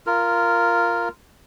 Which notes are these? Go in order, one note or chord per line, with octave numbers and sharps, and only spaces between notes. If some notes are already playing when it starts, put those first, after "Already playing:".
F4 A#4